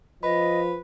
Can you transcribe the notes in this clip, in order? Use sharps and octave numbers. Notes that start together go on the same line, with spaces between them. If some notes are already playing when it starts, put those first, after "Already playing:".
F3 B4 D#5 B5